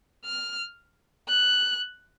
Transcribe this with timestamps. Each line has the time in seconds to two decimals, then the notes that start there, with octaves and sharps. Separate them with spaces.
0.26 F6
1.29 F#6